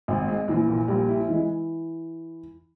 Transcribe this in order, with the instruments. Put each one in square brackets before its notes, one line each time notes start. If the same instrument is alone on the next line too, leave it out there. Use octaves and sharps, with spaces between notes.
[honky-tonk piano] G#1
G#3
[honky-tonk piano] A#1 [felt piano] E3
[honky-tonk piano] A#2
[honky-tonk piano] A#1 [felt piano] G3
[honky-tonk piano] E4
[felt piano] E3 [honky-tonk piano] G#3